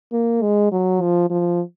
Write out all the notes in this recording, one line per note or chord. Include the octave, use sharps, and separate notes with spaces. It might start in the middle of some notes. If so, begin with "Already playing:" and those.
A#3
G#3
F#3
F3
F3